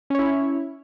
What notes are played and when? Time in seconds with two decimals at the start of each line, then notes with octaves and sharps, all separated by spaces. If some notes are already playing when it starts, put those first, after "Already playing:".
0.10 C#4
0.15 C#5
0.19 E4